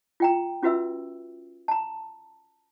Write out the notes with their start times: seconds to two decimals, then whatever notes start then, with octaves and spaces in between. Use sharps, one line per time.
0.20 F4 G5 A#5
0.63 C#4 F4 F#4 B4 E5 E6
1.68 A5 A#5